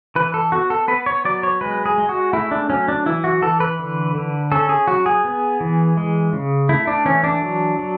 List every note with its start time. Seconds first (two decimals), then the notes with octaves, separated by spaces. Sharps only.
0.16 E3 B4
0.34 A4
0.52 B3 F#4
0.70 A4
0.88 B3 B4
1.06 C#5
1.25 F#3 D5
1.43 C#5
1.61 G#3 B4
1.86 G#4
1.98 G#3
2.09 F#4
2.33 A3 E4
2.51 D4
2.70 F#3 C#4
2.88 D4
3.06 E3 E4
3.24 F#4
3.42 E3 A4
3.60 B4
3.79 D3
4.15 D3
4.52 C#4 A4
4.69 G#4
4.87 F#3 F#4
5.06 G#4
5.25 B3
5.60 E3
5.97 G#3
6.33 C#3
6.69 A3 E4
6.87 D4
7.05 E3 C#4
7.24 D4
7.42 F#3
7.79 F#3